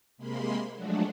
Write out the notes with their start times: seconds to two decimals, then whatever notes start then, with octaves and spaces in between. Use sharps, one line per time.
0.17 C3 G#3 A#3 B5 C6
0.73 F3 F#3 G#3 A3 D4 F#4